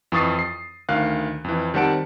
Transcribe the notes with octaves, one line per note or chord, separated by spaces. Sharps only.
F2 E3 C#6 D#6 A6 C7
C7
D2 D#3 F5 F#6
F2 E3
D#3 G3 C4 F#5 A5 D7